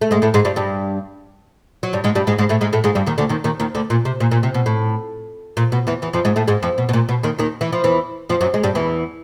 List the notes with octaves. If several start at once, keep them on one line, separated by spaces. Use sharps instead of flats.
A3
G#2 G#3
A2 A3
G#2 G#3
G2 G3
G2 G3
F#3
G2 G3
G#2 G#3
G2 G3
G#2 G#3
G#2 G#3
A2 A3
G#2 G#3
A2 A3
G#2 G#3
G2 G3
D#2 D#3
D2 D3
D#2 D#3
D#2 D#3
D#2 D#3
D2 D3
A#2
C3
A#2
A#2
C3
B2
A2
A#2
B2
E2 E3
E2 E3
F2 F3
G#2 G#3
A2 A3
G#2 G#3
F2 F3
B2
B2
A#2
B2
D#2 D#3
D#2 D#3
E3
F3
E2 E3
F2 F3
F#2 F#3
G#3
G2 G3
E2 E3